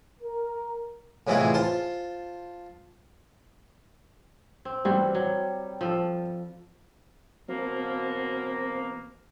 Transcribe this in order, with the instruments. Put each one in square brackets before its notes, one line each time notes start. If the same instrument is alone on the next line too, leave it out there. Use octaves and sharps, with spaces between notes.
[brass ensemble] A#4
[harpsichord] A2 C3 E3 G#3 E4 F4
F4 C5 A5
[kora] C4
[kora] E3 F#4 C5 [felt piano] G3
[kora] F#3
F3 A4
[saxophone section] E2 B2 A#3 [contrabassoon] F#3 [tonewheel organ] C4 C5